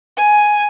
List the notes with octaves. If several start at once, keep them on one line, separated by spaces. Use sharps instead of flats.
G#5